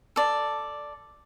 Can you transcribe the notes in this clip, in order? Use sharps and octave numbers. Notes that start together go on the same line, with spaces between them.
A4 D5